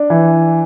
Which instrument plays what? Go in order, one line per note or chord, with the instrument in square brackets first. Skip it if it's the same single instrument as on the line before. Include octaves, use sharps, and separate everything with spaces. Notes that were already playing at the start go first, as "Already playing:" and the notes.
Already playing: [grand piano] D4
E3